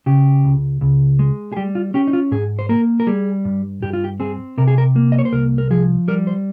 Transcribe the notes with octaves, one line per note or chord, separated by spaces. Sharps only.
C#3 G4
C#2
C#2
G#3
G#4
G3 G4
F4
C#4 G4
D#4
F4
G#2 G#4
C5
A#3 A#4
A#4
G3 G#4
G2
G2 G4
F4
G4
C4 G#4
C3 A#4
G#4
A#4
A#3
D#5
C#5
C5
C2 A#4
A#4
F3 G#4
G3 A#4
C5